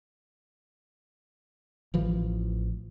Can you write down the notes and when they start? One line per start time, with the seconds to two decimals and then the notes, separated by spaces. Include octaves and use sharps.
1.94 A1 E3 F3